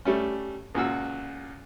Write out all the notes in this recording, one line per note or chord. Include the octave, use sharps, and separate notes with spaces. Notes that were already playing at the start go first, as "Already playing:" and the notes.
G3 A3 C#4
C#2 A#2 F#4 E6